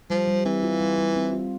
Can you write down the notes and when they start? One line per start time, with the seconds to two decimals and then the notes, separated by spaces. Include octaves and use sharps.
0.10 F3 G3
0.27 G3
0.45 E3 C4
0.64 F4
0.81 G3
0.98 G3
1.16 C4
1.33 F4